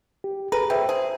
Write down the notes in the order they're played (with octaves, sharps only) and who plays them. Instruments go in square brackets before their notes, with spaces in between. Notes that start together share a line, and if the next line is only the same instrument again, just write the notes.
[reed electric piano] G4
[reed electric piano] G#4 A4 A#5 [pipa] B4
[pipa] B2 [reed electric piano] C5 E5 G5
[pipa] G#4 [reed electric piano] C5